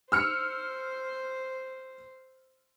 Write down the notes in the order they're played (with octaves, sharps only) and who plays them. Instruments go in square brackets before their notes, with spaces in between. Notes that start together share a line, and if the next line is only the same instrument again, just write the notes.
[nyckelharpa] C5 [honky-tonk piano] E6 F6 C#7